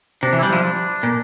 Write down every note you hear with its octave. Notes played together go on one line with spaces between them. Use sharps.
C3 D4
E3
E4
G3 D4
F3
A#2